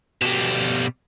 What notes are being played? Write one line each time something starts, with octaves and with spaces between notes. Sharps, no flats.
B2 G3